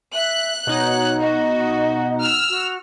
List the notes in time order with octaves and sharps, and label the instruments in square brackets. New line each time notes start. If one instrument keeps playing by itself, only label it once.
[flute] E5 [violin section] F#6
[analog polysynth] B2 D#4 F#5 [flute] C#5
[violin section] F#4 [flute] D#5
[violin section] E6 F6
[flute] F#4